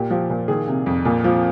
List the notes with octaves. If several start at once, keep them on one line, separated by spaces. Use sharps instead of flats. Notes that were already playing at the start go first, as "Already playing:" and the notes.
Already playing: A#2 G4
F3 G4
A#2
D#3 G#4
C3
F2
A#2
F3